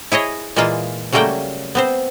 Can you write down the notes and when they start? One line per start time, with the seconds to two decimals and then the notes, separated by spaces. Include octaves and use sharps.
0.12 E4 G#4 C#5 D#5
0.56 A#2 E3 G#3 A#3 F4
1.13 C#3 F#3 G3 A3 A#3 G5
1.75 B3 C4 C5